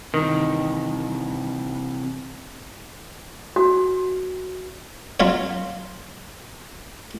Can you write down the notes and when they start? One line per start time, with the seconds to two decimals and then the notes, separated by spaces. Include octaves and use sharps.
0.14 C3 D#3 E3
3.56 F#4
5.20 F#3 F4 C#5